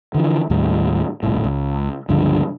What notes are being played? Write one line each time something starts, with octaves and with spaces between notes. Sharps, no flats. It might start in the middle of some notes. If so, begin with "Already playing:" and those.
D3 E3 F3
D#2 A2 G3
D#1 C2 A2
C#2
C#2 G2 D3 F3